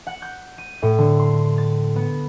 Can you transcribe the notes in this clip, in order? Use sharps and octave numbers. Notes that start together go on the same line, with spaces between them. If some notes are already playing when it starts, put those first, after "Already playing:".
F#5
G6
D#7
A2
D3
C6
A6
B3